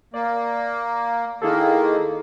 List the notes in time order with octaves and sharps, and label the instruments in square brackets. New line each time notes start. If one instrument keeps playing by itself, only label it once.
[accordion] A#3 [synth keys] D5
[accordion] D#3 A#3 [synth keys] E4 G#4 A4